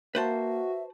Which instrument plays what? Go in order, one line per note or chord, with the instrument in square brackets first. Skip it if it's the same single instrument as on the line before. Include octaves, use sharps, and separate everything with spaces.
[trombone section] A#3 [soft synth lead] F#4 [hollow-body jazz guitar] B4 C5 A5 [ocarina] E5